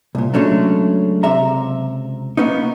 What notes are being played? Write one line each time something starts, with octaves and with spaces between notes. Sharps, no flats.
C2 A#2
C#3 F#3 G#3 A3 C#4 D4
C#2 C3 E5 A#5
A#3 B3 C#4 D#4